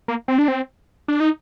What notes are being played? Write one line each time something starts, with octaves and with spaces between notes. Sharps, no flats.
A#3
C4
D4
C4
D4
D#4